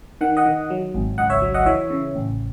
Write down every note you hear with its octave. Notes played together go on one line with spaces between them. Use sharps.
D#3 F#5
D#5 F#5
D#3
F#3
G#1
C#2 D#5 F#5
C#5 E5
F#3
D#5 F#5
E3 C#5 E5
C#3
A1